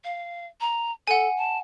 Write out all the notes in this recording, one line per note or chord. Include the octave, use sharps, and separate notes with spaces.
F5
A#5
A4 F#5 G#5
A5